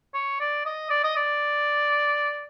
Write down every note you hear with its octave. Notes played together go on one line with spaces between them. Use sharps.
C#5
D5
D#5
D5
D#5
D5